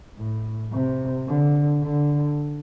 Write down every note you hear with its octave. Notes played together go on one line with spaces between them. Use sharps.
A2
C3
D3
D3